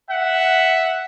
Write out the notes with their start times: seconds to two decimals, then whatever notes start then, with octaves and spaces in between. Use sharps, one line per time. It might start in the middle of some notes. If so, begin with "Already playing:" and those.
0.10 E5 F#5